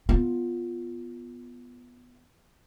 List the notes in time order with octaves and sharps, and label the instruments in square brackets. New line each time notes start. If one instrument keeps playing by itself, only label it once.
[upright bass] B3 F4